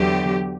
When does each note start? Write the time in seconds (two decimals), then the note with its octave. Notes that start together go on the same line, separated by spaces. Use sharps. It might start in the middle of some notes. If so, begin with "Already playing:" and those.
Already playing: E2 D3 F#3 G4